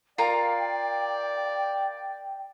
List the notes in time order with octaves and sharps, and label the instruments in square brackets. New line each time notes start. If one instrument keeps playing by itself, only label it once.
[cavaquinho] F4 A#4 F5 [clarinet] D5 [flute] G5